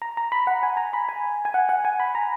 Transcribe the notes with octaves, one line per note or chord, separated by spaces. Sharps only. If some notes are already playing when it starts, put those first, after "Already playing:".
A#5
A#5
B5
F#5
G#5
A#5
B5
G#5
G#5
F#5
F#5
G#5
B5
A#5